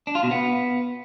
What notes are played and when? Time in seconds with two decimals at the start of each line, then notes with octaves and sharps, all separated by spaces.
0.07 D4
0.15 F4
0.23 B2
0.31 B3